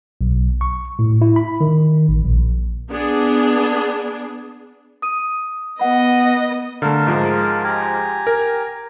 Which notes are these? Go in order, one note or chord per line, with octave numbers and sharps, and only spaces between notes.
B1
C#6
A2
E4
B5
D#3
A1
A#1
B3 D4 G#4
D#6 D#7
B3 D#5 F#5 B5
D3 A3 A#4 F5 A5
G#2 F3 G#3
G4 G#5 A#5
A#4